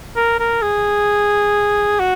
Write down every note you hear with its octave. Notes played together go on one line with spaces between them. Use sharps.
A#4
A#4
G#4
F#4